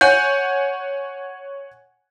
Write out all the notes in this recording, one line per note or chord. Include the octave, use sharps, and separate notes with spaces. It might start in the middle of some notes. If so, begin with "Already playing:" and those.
C#5 F#5 G#5 G6